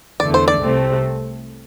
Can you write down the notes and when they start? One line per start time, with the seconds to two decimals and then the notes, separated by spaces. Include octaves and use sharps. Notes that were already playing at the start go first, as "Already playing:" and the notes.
0.20 E2 D3 A3 D5
0.34 C5
0.48 D5
0.62 C2 C3 A3 C4